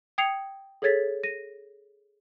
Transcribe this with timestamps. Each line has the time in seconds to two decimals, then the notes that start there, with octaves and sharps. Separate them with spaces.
0.18 G5 D#6 G#6 C7 C#7 F7
0.82 G#4 A4 C#5 G#6 A6 B6
1.23 A#6 D#7